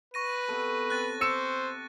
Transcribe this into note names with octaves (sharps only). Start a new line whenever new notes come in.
B4 C#6 A#6 D#7
C3 B3 A4
C4 F#6 A6
C5 D6 E6 C#7 E7